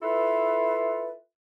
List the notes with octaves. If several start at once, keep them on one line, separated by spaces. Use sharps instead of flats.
E4 F4 A4 B4